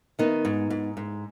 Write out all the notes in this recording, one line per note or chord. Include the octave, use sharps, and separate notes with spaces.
D#3 B3 D#4
G#2
G#2
G#2